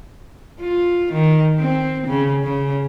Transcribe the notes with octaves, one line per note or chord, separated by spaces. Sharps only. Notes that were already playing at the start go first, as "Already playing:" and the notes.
F4
D#3
C4
C#3
C#3